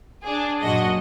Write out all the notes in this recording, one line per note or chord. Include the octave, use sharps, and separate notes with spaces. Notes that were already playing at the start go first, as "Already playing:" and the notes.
D4 G#4
F#2 A#2 F#4 D#5